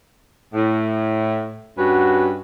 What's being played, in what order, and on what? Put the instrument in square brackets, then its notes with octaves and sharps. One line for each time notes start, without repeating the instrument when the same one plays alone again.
[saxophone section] A2
[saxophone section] G2 C#4 B4 [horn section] F#4